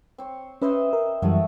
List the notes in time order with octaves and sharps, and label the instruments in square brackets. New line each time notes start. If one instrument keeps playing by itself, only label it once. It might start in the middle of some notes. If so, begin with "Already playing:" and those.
[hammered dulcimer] C4 C#5
[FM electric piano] C#4 B4 [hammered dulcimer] C5 D#5 E5
[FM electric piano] A#4
[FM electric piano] F#2 E3 G3 [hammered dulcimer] F#3 A3 F#4